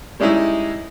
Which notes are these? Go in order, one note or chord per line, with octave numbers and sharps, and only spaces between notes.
G3 G#3 C#4 D#4 E4